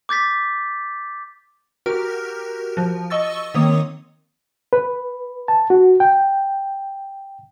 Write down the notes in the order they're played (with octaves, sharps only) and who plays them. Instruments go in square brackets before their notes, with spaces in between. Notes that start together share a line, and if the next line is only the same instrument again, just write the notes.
[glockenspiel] D6 G6 A6 B6
[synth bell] F#4 G4 A#4 F6
F3
D#5 C#6 E6 A6
D#3 A#3 C4 C#5 D#6
[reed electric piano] B4
A5
F#4
G5